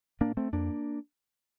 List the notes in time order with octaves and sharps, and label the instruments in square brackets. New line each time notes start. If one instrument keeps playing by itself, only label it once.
[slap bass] A2 A#3 D4
A3 C4
F2 A#3 D4